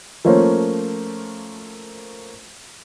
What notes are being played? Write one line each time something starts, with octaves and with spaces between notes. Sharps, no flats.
F3 A3 A#3 C#4 C5